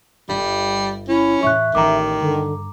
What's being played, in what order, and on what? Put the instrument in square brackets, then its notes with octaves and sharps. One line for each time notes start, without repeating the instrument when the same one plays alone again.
[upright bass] G1 [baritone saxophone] G3
[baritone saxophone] C#4 [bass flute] E4
[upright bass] E2 A2 [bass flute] E5 [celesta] C#6 F#6
[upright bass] A1 B3 [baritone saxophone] D#3 [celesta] A#5 D6
[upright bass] G2 [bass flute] D3